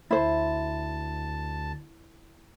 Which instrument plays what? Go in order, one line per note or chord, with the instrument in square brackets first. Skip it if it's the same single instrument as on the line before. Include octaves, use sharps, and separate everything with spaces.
[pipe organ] D2 A5 [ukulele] E4 C5